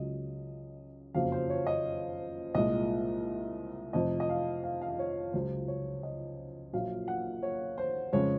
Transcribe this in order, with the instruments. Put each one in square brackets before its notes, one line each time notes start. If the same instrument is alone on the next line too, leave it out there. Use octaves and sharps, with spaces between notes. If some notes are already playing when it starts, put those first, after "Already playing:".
Already playing: [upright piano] C#2 C#3 F#3 D#5
F#1 F2 C#3 F#3 F5
C5
C#5
D#5
C2 A#2 G#3 D#5
F1 F2 C3 D#5
D#5
F5
F5
F5
D#5
C#5
C#2 C#3 F#3 C5
C#5
D#5
A#1 A#2 F#3 F5
F#5
C#5
C5
F2 C#3 G#3 C#5